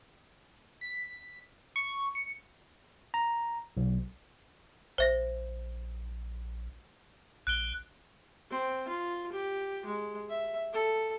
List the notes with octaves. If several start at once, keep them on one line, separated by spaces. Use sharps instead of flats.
B6
C#6
C#7
A#5
B1
A#1 C5 E5 A#6
A#1 F#6 D7 G7
C4
F4
G4
G#3
E5
A4